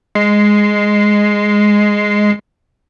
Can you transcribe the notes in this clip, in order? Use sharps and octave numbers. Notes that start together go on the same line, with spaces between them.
G#3 C7